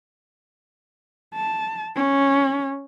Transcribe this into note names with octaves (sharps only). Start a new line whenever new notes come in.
A5
C#4